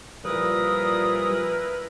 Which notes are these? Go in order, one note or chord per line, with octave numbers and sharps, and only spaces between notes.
A#2 F3 G3 E4 A#4 B4 D#6